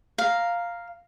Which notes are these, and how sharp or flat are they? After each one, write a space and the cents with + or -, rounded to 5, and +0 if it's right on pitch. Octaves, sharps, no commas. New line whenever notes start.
F5 +0 A#5 +0